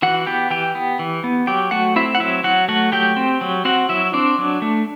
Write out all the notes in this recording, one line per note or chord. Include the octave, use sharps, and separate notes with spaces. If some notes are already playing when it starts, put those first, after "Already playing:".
E3 F#4 F#5
B3 G4 G5
E3 G4 G5
B3
E3
B3
F#3 G4 G5
A3 F#4 F#5
C4 E4 E5
F#5
F#3 E4 E5
F#3 F#4 F#5
A3 F#4 F#5
F#3 G4 G5
C4
F#3
C4 F#4 F#5
F#3 E4 E5
C4 D4 D5
F#3
A3